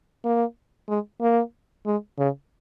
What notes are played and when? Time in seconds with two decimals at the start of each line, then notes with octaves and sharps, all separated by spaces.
0.25 A#3
0.89 G#3
1.21 A#3
1.86 G#3
2.18 C#3